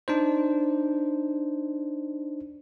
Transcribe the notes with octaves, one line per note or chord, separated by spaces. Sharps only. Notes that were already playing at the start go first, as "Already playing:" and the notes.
D4 D#4 C5